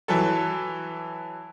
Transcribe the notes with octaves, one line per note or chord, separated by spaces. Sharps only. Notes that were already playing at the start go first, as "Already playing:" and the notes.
E3 F#3 A4